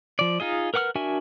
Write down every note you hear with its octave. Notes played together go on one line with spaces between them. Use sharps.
F3 D5
D#4 F4 G#4 D#5
A#4 B4 F#5 D6 F6
D4 F#4 A#4 E5 G#5